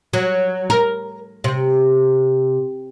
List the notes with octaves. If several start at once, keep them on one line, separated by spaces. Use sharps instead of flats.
F#3
A#4
C3